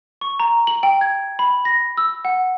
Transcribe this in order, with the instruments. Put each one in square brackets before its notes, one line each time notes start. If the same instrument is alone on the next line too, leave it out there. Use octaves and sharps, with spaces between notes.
[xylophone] C#6
A#5
F#7
G5
G#6
B5
A#6
E6
F#5